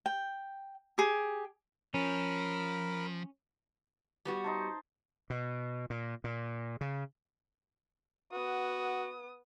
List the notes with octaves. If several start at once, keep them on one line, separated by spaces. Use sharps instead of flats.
G5
G4 G#4
F3 C#4 A#4 B5
G3 B3 F#4
D#4 C5 A5
B2
A#2
A#2
C#3
B3 F#4 D#6